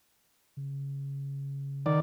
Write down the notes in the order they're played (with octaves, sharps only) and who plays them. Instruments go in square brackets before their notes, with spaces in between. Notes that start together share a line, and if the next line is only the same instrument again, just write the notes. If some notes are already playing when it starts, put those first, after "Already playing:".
[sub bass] C#3
[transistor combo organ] D#3 D5